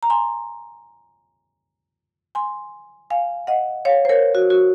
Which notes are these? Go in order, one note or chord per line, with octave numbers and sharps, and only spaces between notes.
A#5
G#5 C6
G#5 C6
F5 G#5
D#5 F#5
C#5 F5
C5
A#4 C#5
F#4
F#4